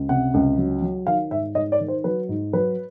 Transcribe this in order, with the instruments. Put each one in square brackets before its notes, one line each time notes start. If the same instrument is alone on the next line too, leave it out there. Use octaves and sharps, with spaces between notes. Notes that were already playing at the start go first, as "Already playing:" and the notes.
Already playing: [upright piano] C#2
C3 F#5
C#2
F#3
F#3
D#3 F5
G#2 E5
G#2 D#5
D5
D#3
C5
F#3 B4
G#2
F#3 B4